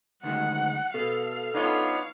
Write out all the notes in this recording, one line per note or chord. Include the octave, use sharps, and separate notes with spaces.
D2 D#3 G#3 F#5
B2 A4 F5
B3 D4 D#4 F4 C#5